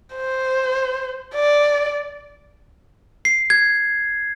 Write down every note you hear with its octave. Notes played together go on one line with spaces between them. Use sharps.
C5
D5
C7
G#6